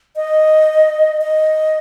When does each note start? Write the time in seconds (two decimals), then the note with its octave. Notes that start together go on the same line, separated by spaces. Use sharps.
0.16 D#5
1.21 D#5